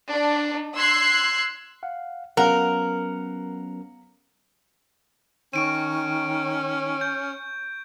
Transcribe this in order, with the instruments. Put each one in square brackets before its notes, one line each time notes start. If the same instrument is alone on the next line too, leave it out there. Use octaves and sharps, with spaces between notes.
[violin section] D4
C6 E6 F#6 G#6 C7
[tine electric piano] F5 F#5
[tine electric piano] F#3 B3 C#4 [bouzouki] A#4 [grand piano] F5 F#5 A#5
[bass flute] D#3 [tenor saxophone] C#4 [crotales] C#6 D7 D#7
[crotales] G6